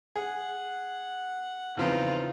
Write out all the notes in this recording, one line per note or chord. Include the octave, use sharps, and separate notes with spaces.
G#4 F#5
E2 C#3 F3 C4 D#4 F4 B4